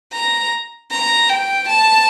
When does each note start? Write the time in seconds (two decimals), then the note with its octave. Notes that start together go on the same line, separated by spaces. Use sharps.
0.13 A#5
0.91 A#5
1.30 G5
1.69 A5